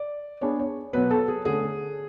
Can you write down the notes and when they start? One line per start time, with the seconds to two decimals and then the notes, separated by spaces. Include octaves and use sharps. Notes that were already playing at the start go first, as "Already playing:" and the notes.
Already playing: D5
0.41 B3 D4 G#4 C#5 D5
0.59 C#5
0.93 B2 F#3 B3 B4
1.11 A4
1.28 G#4
1.45 D3 A3 C#4 G#4